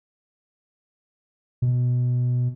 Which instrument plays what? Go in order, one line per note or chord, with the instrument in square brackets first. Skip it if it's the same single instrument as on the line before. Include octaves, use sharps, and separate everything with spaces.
[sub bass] B2